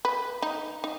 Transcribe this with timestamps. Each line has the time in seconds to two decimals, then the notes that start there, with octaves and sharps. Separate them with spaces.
0.05 B4
0.42 D#4
0.84 D#4